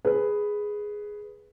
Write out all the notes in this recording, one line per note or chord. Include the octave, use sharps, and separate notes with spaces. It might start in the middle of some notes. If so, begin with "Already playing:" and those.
G#4 B4